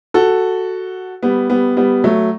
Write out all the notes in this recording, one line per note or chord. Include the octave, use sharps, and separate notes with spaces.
F#4 A4
G3 B3
G3 B3
G3 B3
F#3 A3